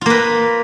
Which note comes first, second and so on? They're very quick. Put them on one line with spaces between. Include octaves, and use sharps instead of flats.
F4 A#3 B4